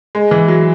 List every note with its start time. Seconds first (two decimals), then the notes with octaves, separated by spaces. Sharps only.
0.15 G#3
0.31 E3
0.48 F#3